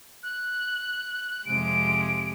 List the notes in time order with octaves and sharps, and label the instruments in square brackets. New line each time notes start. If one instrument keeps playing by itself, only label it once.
[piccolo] F#6
[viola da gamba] F2 C3 G#3 [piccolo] D7